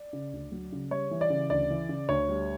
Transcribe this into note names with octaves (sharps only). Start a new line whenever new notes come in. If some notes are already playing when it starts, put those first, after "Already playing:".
Already playing: D5
C#3
D2
F#3
C#3
G3 C#5
E3
D5
C#3
D2 D5
E3
C#3
D2 C#5
G3